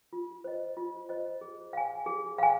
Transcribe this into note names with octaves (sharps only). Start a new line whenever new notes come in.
F4
C5 D#5
F4
C5 D#5
G#4
F5 G#5
G#4
F5 G#5